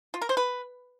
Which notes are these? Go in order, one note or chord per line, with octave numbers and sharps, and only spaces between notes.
F4
A#4
C5
B4